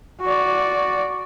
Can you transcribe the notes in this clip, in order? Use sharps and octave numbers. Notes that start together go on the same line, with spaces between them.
F#4 D5